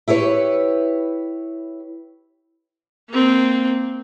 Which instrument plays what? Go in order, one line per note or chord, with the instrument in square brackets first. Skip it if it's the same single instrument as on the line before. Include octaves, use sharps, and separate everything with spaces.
[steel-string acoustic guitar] E4 G4 B4 C#5
[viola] A#3 C4